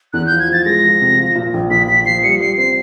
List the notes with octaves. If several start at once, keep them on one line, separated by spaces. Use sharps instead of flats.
E2 F#6
G6
F3
G#6
F3 A6
G#3 A#6
F3
C3
F3
A#2
A#1
A#1 B6
A#2 B6
F3 C7
G3 C#7
G3 C7
C4 C7